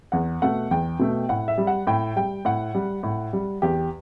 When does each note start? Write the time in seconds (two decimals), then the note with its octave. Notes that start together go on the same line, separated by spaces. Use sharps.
0.12 E2 F#5
0.42 B2 A3 F#5
0.71 E2 G5
0.99 B2 A3
1.29 A2 F#5
1.48 E5
1.58 G3
1.67 F#5
1.87 A2 G5
2.16 G3 G5
2.45 A2 F#5
2.75 G3
3.03 A2
3.33 G3
3.62 E2 G4